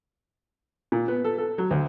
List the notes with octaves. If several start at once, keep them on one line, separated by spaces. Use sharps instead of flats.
A#2
B3
A4
A4
F#3
D2